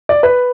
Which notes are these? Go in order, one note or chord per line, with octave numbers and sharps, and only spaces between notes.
D5
B4